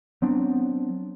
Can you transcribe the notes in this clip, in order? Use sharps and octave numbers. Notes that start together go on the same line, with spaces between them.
F#3 B3 C4 D4